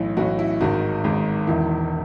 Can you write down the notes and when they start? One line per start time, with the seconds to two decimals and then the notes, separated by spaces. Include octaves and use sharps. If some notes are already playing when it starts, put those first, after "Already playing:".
Already playing: B1 A2 E3
0.17 B1 A2 E3 F#4
0.39 E4
0.61 G#1 G#2 D#3 F#4
1.04 G#1 G#2 D#3
1.47 E1 E2 D#3 E4